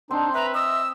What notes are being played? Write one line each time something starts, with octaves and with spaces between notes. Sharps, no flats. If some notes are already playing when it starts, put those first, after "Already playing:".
C4 D4 D#4 C5
B4 E5 A#5
D#5 E6